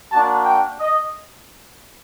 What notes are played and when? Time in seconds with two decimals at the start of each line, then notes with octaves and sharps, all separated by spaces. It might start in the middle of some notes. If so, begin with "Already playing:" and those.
0.11 A#3 D4 F#4 A5
0.45 G5
0.80 D#5